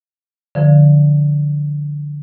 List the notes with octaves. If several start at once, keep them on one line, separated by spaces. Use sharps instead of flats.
D3 F3